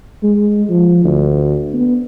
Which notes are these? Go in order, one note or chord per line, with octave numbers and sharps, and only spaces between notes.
G#3
F3
D2
B3